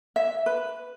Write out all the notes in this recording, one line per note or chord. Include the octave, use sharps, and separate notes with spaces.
E5
B4